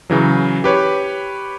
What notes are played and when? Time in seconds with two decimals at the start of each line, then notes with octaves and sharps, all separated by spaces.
0.10 C#3 E3 F#3
0.64 G4 B4 C#5